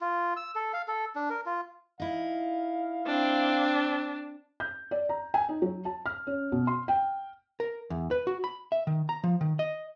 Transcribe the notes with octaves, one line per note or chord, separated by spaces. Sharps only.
F4
E6
A4
F5
A4
D4
A#4
F4
D#4 E4 F5
C4 D4
G6
D5
A#5
G#5
D#4
F#3
A5
F6
C#4
B2
C6
G5
A#4
E2
B4
F#4
B5
E5
D#3
A#5
F3
D#3
D#5